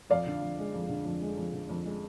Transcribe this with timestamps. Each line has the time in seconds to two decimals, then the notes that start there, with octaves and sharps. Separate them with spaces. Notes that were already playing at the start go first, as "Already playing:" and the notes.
0.10 F2 D5 F5
0.27 D3
0.41 F2
0.58 G#3
0.74 F2
0.89 D3
1.06 F2
1.22 G#3
1.37 F2
1.53 D3
1.69 F2
1.85 G#3